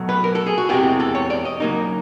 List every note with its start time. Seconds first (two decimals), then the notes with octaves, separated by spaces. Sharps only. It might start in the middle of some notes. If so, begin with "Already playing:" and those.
Already playing: B2 F#3 A3
0.09 B4
0.24 A#4
0.35 A4
0.47 G#4
0.58 F#4
0.69 E2 C3 E3 G#3 C4 G4
1.00 A4
1.15 C#5
1.30 D5
1.45 D#5
1.60 C#3 F#3 A#3 D#4